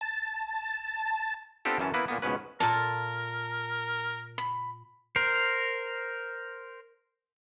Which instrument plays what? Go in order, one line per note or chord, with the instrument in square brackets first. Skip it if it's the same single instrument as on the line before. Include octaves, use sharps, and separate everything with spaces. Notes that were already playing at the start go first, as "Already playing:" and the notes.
[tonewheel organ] A5
[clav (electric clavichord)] B3 C4 D4 F4 G4 A4
F#2 E3 C#4 A5
A#3 B3 E4 B4
A#2 A#3 B3
C#2 G#2 B2 C#4 B4
[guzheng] A#2 F4 A4 [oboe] A#4 [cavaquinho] A5
[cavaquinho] B5
[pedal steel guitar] A#4 C5